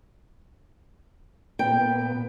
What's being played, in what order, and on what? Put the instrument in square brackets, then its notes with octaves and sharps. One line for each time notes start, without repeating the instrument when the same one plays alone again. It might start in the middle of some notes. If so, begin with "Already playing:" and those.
[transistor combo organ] A#2 B3 [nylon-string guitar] G5